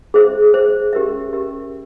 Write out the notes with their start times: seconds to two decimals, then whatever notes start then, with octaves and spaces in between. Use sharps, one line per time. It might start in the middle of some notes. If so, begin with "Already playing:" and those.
0.14 G#4 C5 E5
0.54 G#4 C5 E5
0.93 C#4 G4 A#4 E5
1.33 C#4 G4 A#4 E5